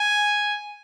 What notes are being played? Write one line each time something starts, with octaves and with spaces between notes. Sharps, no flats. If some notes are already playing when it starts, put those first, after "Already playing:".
Already playing: G#5